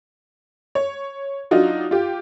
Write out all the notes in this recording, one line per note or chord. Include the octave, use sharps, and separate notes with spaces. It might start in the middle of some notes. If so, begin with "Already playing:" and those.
C#5
F#3 D4 D#4 F4 F#4
F4 G4